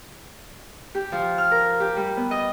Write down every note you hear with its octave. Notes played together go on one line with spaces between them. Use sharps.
G4
F3
F6
A#4
G4
G3
B3
D#5